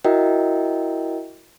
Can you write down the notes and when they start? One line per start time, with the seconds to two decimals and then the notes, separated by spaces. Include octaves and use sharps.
0.04 E4 F#4 A#4 D#5 E5 G5